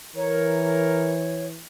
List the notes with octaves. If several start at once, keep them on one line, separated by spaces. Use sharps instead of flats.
E3 A#4 C#5